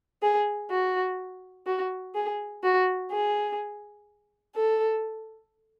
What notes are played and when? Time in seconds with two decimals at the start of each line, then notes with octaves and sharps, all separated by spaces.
0.22 G#4
0.71 F#4
1.67 F#4
2.15 G#4
2.63 F#4
3.11 G#4
4.55 A4